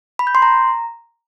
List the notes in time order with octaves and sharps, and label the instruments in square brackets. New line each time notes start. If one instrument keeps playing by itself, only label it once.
[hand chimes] B5
G6
C6
A#5